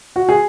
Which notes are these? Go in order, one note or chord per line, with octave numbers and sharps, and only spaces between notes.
F#4
G#4